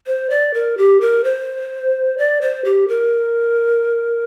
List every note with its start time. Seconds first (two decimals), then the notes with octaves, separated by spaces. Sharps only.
0.07 C5
0.30 D5
0.54 A#4
0.78 G4
1.01 A#4
1.24 C5
2.18 D5
2.41 C5
2.65 G4
2.88 A#4